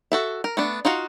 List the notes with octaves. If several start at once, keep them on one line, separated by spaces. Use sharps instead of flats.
F#4 A4 E5
A#4
A3 B3 D4
D#4 F4 F#4 F5